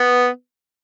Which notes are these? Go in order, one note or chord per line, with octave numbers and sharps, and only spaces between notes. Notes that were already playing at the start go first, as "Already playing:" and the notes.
Already playing: B3